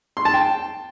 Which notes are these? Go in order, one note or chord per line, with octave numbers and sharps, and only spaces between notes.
C6
A5
G5